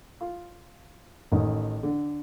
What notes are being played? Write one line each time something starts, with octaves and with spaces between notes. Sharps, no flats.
F4
A1 D#3
D3